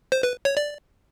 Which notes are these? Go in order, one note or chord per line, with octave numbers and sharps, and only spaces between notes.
C5
B4
C#5
D5